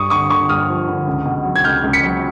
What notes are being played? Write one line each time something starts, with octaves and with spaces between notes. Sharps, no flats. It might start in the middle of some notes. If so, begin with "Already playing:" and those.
Already playing: G2 C#6 D#6
D3 C#6 D#6
D3 C#6 D#6
G2 D#6 F6
F3
D3
C#2
B2
F#3
G#6
C#2 F6 G6
C#2
B6 C#7
F#3